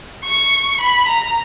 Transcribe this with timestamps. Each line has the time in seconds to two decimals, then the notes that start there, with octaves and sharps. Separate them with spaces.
0.24 C#6
0.81 B5
1.08 A#5